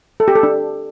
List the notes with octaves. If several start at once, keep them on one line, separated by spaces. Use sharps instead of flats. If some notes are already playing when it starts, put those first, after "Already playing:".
A4
G4
A4
D4